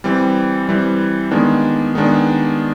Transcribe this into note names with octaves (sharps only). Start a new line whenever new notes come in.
E3 G3 C4
E3 G3 C4
D#3 G#3 B3 D4
D#3 G#3 B3 D4